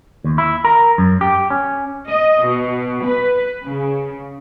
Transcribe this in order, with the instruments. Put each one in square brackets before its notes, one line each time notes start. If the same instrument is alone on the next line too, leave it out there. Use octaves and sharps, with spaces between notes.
[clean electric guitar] D#2
E4
A#4
F#2
G4
C#4
[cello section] D#5
B2
B4
C#3